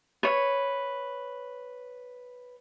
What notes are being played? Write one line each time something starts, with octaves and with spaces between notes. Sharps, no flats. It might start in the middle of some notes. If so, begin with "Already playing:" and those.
B4 C#5